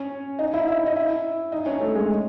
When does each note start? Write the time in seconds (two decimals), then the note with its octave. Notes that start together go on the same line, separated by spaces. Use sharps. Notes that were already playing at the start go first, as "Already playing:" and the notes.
Already playing: C#4 C#5
0.39 D#4 D#5
0.54 E4 E5
0.68 E4 E5
0.86 D#5
0.96 E4 E5
1.52 D#4 D#5
1.66 C#4 C#5
1.80 A3 A4
1.95 G#3 G#4